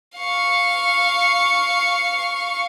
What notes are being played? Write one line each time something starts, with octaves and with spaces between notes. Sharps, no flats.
F5 C#6